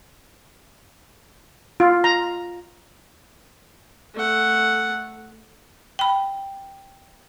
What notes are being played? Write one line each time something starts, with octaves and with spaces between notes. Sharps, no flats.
F4
A#5
A3 F#5
G5 B5